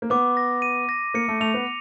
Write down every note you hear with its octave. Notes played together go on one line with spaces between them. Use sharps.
A#3
B3 D6
A#6
D#7
A#6
A#3 C#7
A3
A3 F7
B3